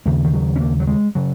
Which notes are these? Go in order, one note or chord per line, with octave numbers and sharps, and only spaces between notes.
D#2 C#3 A#3
D#3
F#3
C#4
A#3
F#3
G#3
C#3 F#3